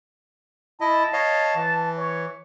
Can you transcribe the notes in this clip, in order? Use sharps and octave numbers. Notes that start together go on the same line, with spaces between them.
E4 D#5 A5
C#5 D#5 F5
E3
C#5